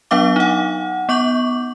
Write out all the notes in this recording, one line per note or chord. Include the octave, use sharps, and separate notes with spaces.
F#3 B3 D4 F5 D6
D#4 F#5
B3 C#6 D6 G6 F#7